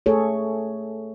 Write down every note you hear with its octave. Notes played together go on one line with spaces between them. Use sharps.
A3 G#4 A4 C#5